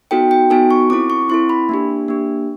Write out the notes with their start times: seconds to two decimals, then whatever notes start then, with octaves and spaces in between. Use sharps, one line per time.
0.11 B3 D#4 F#4 A4 G5
0.31 G5
0.50 B3 D#4 F#4 A4 G#5
0.71 C#6
0.90 C4 E4 A4 D6
1.10 C#6
1.29 C4 E4 A4 C6
1.49 B5
1.69 A#3 D4 G4
2.08 A#3 D4 G4